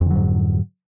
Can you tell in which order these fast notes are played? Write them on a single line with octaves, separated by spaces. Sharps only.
F2 D3 F#3 G#2